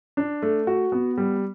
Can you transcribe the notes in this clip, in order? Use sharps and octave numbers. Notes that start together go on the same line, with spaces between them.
D4
A3
F#4
B3
G3